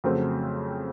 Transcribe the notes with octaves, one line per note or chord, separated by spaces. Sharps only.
F2 C#3 F#3 A3 C4